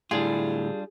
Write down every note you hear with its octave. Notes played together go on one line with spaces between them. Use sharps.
A2 D3 G3 D4 E4 F4 G#4